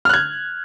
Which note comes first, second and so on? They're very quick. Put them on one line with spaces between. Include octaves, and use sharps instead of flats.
F6 F#6 G#6